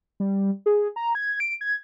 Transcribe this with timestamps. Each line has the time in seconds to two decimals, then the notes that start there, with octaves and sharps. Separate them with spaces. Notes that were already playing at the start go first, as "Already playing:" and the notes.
0.20 G3
0.66 G#4
0.96 A#5
1.15 G#6
1.40 D7
1.61 G#6